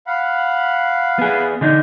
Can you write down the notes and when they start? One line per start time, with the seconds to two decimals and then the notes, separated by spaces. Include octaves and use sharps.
0.07 F5 F#5 B5
1.19 B3 G#4
1.61 D3 D4 D#4